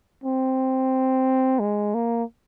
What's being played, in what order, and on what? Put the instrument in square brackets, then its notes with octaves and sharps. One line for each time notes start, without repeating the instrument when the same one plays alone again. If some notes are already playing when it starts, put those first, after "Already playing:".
[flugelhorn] C4
G#3
A#3